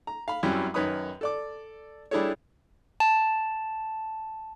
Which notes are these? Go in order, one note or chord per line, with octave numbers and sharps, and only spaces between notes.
A#5
F5 B5
F#2 F#3 G3 C4 C#4 E4
F#2 D#3 B4 C#5 B5 D#6
A4 D5 D6
G3 D4 E4 G#4 A4 C#5
A5